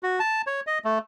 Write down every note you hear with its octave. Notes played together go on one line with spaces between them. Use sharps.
F#4
A5
C#5
D#5
A3